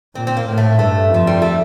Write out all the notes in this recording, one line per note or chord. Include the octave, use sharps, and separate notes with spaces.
A#2 C4
C4
A#3
A2
A3
G2 A3
F2 F3
G3
A3